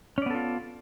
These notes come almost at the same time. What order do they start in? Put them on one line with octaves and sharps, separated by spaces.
C#4 D5 B3 A4 F4